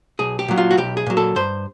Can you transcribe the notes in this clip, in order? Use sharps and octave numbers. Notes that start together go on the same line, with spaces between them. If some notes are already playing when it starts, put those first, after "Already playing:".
B1 G#4
G4
A#2 F#3
F4
F#4
B1 G4
G#4
A#2 F#3
A4
G2 C5